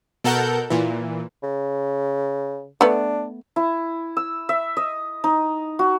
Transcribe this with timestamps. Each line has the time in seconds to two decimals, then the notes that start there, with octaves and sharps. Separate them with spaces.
0.24 B2 A4 A#4 F#5 G6
0.70 A#2 E3
1.43 C#3
2.81 A3 B3 D4
3.56 E4
4.17 E6
4.49 E5
4.77 D#5
5.24 D#4
5.79 F#4